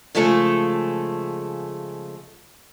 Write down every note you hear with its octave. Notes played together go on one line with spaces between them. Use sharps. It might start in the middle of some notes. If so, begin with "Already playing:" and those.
C#3 F3 G#3 A3 A4